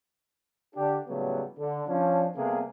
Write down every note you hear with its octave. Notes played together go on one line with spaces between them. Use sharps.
D3 D4 G4
A2 C#3 F#3 G3 A3 B3
D3
F3 C#4 D4
C3 G3 A#3 B3 G#4 A4